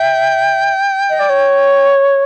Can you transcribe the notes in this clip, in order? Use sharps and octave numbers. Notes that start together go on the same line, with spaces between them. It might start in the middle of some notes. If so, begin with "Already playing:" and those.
Already playing: E5 G5
D#5
D5
C#5